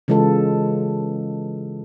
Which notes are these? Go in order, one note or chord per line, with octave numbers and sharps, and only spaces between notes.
C#3 E3 G#3 F4 A4